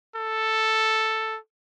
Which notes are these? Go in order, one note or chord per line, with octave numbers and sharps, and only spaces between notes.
A4